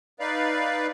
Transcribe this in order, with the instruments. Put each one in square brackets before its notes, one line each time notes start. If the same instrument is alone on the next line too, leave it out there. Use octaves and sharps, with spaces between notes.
[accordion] D#4 B4 D5 F5